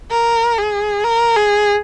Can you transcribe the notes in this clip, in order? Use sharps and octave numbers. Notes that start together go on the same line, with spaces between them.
A#4
G#4
A#4
G#4